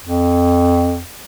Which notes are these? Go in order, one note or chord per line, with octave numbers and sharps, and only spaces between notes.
F2